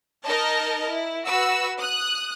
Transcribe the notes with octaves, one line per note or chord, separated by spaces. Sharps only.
D#4 A#4 D#5 A5
E4
F#4 B4 E6
D#6 F#6